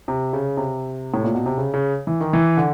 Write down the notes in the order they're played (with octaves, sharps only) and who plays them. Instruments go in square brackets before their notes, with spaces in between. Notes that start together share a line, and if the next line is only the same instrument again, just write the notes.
[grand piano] C3
C#3
C3
A2
A#2
B2
C3
C#3
C#3
E3
D#3
E3
D3